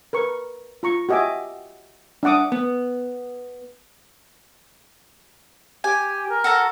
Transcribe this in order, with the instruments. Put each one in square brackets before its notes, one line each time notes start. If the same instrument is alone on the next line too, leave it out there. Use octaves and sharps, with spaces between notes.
[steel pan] A#4 B4 C#6
F4 A#5 C#6
F#4 G4 D#5 E5 G#5 D6
D4 E5 F#5 D6 D#6
[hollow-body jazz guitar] B3
[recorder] G4 [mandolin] G#5
[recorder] A#4
[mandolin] F#4 A4 A#5